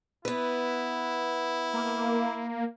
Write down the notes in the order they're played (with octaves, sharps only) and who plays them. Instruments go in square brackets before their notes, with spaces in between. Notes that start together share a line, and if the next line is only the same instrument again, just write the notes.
[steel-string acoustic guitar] B3 B4 [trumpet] E4
[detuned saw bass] A#3